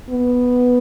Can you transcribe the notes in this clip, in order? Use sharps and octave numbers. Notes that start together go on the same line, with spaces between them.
B3